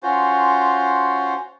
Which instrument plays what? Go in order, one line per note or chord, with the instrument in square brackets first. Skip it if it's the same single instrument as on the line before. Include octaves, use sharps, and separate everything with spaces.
[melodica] C#4 F4 F#4 C5